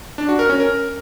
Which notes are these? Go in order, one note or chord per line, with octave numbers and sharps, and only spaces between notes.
D4
F#4
A#4
C#4
A#4